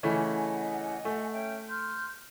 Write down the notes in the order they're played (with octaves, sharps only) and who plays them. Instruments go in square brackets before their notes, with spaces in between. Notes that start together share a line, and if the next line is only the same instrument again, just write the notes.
[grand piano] C#3 E3 A3 [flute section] D#5 F#5 G#5
[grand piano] A3
[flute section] C#4 E5 G5
C6 F6 G6